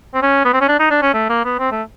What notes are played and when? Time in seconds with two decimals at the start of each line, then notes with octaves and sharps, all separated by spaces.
0.14 C4
0.22 C#4
0.45 B3
0.54 C4
0.61 C#4
0.68 D4
0.80 D#4
0.91 D4
1.02 C#4
1.14 A3
1.29 A#3
1.45 B3
1.59 C4
1.72 A3